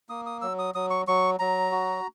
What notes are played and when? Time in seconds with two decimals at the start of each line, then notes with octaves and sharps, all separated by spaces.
0.09 A#3 D#6
0.26 D#6
0.42 F#3 E6
0.59 D#6
0.75 F#3 D#6
0.90 C#6
1.08 F#3 C#6
1.39 F#3 A#5
1.71 F#4